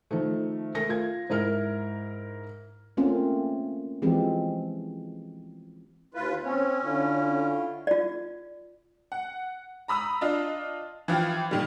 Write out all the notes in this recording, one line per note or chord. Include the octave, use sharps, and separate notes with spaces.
D#3 F3 A3
A3 A#4 A#6
F4 G#6
G#2 E4 A#4 F6
A3 A#3 C4 C#4 F4
E3 F3 G#3 C4 G4
D#2 E4 F4 B4
C4 C#4 C#5
D3 E4 F4
F4 D5
F#5
A#5 B5 D#6 E6
D4 F4 D#5
E3 F3 F4 G4
A#2 D#3 G3